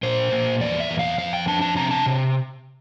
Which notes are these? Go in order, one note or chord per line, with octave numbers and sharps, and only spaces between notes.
A#2 C5
A#2
E2 D5
E5
E2
F5
F2 F5
G5
D4 A5
A5
C3 A#5
A5
C3